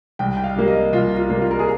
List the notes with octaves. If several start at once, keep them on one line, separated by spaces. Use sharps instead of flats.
C2 G5
G5
F5
C3 G3 A#3
D#5
C2 F4
F4
C3 G3 A#3
F4
A#4
G#4